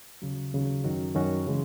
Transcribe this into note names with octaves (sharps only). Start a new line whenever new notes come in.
D#2 C#3 F#3
D#2 C#3 F#3
F#2 D#3 F#3 C#4 F#4
F#2 D#3 F#3 C#4 F#4
C#3 E3 G#3